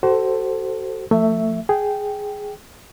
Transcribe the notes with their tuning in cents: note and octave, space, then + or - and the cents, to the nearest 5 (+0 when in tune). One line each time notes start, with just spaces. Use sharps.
F#4 +35 A4 +5 C5 +0
F3 +0 A3 +25 E5 +0
G#4 +0 G5 -10